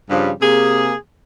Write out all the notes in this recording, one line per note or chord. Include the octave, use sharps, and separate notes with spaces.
G2 C#3 F3 G3
C3 A#3 G#4